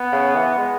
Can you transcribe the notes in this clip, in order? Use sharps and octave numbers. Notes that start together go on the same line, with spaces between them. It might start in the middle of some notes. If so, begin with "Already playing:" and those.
Already playing: B3
C#3
E3
G#3